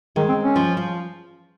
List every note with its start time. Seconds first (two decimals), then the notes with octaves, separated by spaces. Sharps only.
0.16 D#3 G#3
0.29 C4
0.43 C#4
0.56 F3
0.77 F3